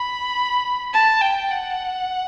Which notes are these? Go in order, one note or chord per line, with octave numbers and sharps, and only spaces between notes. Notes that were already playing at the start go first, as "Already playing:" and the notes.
Already playing: B5
A5
G5
F#5